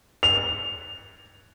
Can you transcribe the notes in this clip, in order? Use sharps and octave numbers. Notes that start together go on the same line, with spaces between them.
F7